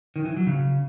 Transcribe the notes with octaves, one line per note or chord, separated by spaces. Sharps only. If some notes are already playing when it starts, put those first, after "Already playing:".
D#3
E3
F#3
C#3